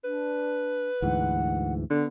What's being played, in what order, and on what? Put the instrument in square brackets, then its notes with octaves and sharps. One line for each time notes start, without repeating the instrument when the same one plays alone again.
[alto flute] D4 [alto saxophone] B4
[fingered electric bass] D2 G#2 E3 [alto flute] F#5
[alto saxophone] D3 [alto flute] B3